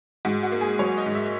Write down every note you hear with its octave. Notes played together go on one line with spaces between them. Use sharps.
G#2 F#4
F#4
A#3
G#4
F#3 C#5
D#5
G#2
E5